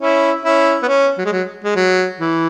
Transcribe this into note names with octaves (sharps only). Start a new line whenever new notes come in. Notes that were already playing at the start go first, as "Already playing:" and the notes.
C#4 E4
C#4 E4
B3
C#4
F#3
G#3
F#3
G#3
F#3
E3